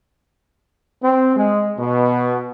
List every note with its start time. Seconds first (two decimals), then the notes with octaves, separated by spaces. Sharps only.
1.02 C4
1.36 G#3
1.79 B2